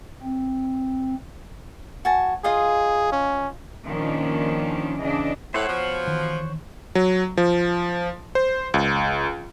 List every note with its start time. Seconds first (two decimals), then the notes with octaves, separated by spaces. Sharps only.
0.23 C4
2.05 F#4 G#5 A5
2.44 F4 G#4 D#5 F5
3.12 C#4
3.85 A#2 D#3 F3 C#4 D4
5.00 C#3 E3 D4 D#5
5.54 A2 C5 C#5 F#5
5.68 B2 F3
6.07 D#3 E3
6.95 F#3
7.37 F3
8.35 C5
8.74 C#2